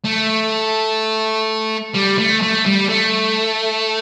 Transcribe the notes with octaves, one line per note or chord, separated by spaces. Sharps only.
A3
G3
A3
A3
G3
A3